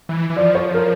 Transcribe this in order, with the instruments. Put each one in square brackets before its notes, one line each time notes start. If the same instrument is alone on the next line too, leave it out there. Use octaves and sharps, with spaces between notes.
[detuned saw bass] E3
E3
[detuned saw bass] F3 [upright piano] D5
[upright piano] C#5
A#4